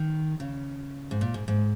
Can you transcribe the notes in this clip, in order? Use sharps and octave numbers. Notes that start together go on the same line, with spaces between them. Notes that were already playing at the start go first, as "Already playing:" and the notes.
Already playing: D#3
C#3
G#2
A#2
G#2
G#2